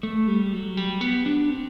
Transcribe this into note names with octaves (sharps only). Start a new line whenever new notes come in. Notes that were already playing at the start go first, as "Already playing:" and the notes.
A3
G3
F#3
G3
B3
D4
C4